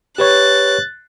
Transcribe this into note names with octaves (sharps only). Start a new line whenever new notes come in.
G4 B4 C#5 F#6 A6